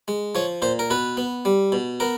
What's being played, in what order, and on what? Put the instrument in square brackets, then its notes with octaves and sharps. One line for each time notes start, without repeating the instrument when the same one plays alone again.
[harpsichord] G#3
F3 C#5
A#2 C5
A#4
B2 B4
B3
G3
B2
B3 A#4